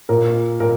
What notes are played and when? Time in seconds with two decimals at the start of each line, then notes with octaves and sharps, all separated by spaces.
0.09 A#2 A#4
0.60 A#2 A#4